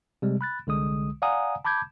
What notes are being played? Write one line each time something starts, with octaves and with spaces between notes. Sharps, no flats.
C3 G3 G#3
B5 F#6 A6
C2 D3 G#3 D#6
D5 F5 F#5 G#5 A#5 D#6
A5 B5 D6 G6 G#6